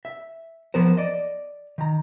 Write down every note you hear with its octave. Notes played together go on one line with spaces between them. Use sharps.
E5
F3 B3 A#4 C5
D5 D#5
D#3 A#5